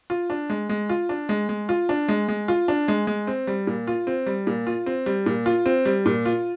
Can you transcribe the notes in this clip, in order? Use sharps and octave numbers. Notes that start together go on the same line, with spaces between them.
F4
D4
G#3
G#3
F4
D4
G#3
G#3
F4
D4
G#3
G#3
F4
D4
G#3
G#3
C4
G3
A#2
F4
C4
G3
A#2
F4
C4
G3
A#2
F4
C4
G3
A#2
F4